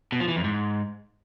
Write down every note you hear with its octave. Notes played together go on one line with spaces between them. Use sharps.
B2
F3
E3
F2
G#2